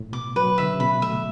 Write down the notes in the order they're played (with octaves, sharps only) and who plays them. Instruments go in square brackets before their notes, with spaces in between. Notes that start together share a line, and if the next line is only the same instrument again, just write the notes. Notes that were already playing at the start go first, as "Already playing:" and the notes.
Already playing: [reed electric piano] A2
[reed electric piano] B2 [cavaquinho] D6
[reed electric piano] F#3 [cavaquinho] B4
[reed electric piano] D3 [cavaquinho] E5
[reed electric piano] C#3
[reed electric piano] B2 [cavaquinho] B5
[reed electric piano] A3 [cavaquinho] E5